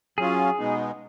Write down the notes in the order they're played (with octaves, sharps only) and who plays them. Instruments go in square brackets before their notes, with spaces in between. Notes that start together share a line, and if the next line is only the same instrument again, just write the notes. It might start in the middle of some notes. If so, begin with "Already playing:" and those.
[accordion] F#3 C#4 F4 [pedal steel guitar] G#4
[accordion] B2 G#3 B3 D#4